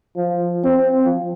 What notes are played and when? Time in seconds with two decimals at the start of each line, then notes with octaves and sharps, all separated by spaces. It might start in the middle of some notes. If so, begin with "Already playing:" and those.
0.16 F3
0.64 C4
1.05 F3